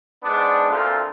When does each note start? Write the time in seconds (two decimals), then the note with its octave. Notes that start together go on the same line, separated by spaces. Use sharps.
0.24 G#2 B3 D4
0.70 D2 A#2 C4 F4 A4